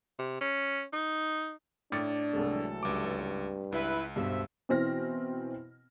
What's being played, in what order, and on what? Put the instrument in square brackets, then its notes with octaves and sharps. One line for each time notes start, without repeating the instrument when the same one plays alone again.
[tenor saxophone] C3
C#4
D#4
[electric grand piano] A2 [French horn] D4 [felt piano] D6 A6 C#7
[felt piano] C2 G#3 A3 [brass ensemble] E3 F#3 A4
[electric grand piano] C#2 D6 [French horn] G2
[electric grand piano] C#2 [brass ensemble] E4 B4
[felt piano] G2 B2 [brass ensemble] A4 C5 E5
[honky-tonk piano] B2 E3 C4 F6 A#6